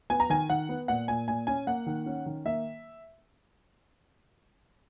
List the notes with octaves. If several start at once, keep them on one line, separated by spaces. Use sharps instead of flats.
B3 G#5
A#5
D#3 G#5
D#3 F#5
B3
A#2 F#5
A#2 G#5
A#2 G#5
C#4 G#5
A#3 F#5
D#3
C#4
D#3
A#3 E5